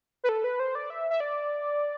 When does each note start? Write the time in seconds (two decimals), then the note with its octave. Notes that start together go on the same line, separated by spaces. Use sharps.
0.24 B4
0.29 A4
0.44 B4
0.60 C5
0.75 D5
0.90 E5
1.10 E5
1.20 D5